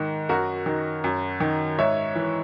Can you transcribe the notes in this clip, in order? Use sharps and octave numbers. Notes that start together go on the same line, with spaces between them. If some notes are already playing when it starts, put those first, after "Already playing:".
Already playing: G#2 D#3
F#2 F#4 A#4
D#3
F#2
D#3
G#2 C#5 E5
E3